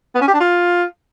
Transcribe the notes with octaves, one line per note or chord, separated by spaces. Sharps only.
B3
C#4
G4
D4
F4